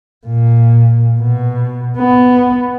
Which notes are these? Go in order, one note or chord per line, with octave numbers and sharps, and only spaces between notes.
A#2
B2
B3